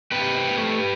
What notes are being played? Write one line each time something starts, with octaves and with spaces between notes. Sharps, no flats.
C3 G4 B4
C4
A3